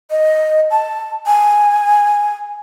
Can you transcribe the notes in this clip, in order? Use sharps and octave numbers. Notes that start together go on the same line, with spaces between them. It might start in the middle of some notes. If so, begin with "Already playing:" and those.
D#5
A5
G#5